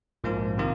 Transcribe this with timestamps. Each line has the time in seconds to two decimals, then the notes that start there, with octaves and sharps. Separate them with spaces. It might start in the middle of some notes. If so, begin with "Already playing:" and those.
0.24 A#1 G#2 F3 A#3 F4
0.58 C3 D#3 A#3 F4